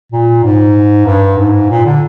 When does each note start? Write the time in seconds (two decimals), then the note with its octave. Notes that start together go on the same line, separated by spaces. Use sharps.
0.12 A#2
0.44 G#2
1.06 G2
1.38 G#2
1.70 A#2
1.86 D3